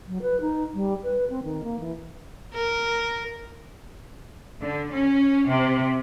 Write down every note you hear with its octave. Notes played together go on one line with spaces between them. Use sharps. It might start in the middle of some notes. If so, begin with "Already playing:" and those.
F#3
B4
D#4
G3
B4
C4
D#3
A#3
E3
A#4
D3
C#4
C3